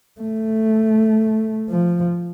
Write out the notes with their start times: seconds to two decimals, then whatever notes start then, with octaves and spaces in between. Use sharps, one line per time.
0.20 A3
1.70 F3